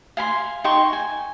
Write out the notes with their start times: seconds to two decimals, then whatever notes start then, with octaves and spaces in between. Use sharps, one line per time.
0.17 F5 G#5 B5 C6
0.64 D#4 G5 C6 C#6
0.93 G#5